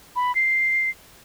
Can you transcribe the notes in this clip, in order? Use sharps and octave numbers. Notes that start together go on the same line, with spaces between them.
B5
C7